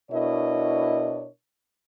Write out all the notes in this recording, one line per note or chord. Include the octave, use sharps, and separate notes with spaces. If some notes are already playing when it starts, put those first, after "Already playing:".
B2 D4 E4 A#4 C#5 D#5